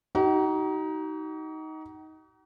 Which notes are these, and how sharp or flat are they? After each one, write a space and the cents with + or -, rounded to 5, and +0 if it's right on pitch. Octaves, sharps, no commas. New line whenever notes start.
D#4 +15 F#4 +45